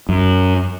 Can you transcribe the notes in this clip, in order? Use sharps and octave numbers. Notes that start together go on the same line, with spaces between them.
F#2